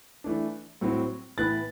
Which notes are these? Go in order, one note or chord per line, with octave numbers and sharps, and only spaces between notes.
E3 A3 D4
A2 F#3 C4
A2 E3 B3 F#6 A6